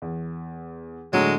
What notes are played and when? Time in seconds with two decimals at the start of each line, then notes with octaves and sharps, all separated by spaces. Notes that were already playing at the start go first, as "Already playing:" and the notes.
0.02 E2
1.13 A2 D3 F#3 G#3